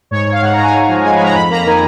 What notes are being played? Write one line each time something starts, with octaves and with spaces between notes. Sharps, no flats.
G#2 C#5
G#2
F5
G#2 F#5
G#2 A#5
G#5
G#2
F3
G#3 G#5
B5
G#3 A#5
F2 B5
A#3 A#5
D#3 G#5